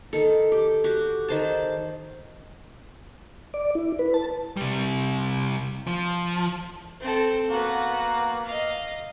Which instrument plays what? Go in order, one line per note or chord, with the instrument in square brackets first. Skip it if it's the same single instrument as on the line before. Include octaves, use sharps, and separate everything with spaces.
[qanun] D#3 A4
G4
F#4 G4
D#3 C5 A5
[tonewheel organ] D5
E4
B4
A5
[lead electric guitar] C3 G3
F3
[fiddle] C4 A4
[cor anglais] A#3 [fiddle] B3 F#4
[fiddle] D#5 F5